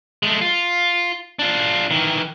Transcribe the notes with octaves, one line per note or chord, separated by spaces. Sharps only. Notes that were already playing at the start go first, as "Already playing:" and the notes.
G#3 A3
F4
D4 F4
D#3 E3